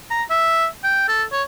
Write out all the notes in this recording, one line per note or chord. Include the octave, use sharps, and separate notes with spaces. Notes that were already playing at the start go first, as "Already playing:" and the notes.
A#5
E5
G5
A4
C#5